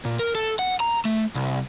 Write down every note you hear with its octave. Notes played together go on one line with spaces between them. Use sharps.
A#2
A#4
A4
F#5
A#5
A3
C2